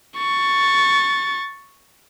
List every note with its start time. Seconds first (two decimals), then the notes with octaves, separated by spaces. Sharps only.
0.18 C#6 A6